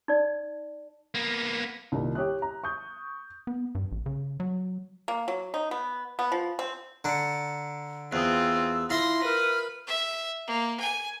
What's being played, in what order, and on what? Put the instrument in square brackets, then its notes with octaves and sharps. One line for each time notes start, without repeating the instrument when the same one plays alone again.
[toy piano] D#4 D5
[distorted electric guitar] A#3 B3
[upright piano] C2 A#2 D#3
G4 C#5 D#6 F#6
A#5
C#6 D#6 G6
[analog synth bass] B3
G2
A1
C#3
F#3
[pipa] A#3
F#3
D#4
B3
B3
F3
C4
[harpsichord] D3 D4 [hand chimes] A#5 C#7
[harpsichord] E2 [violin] C4 F4 [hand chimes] D#6 F#6 [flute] E6
[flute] E4 [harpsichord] F4 E5 [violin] C6 A#6
[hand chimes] A#4 [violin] B4 [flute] F6
[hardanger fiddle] E5
A#3
G#5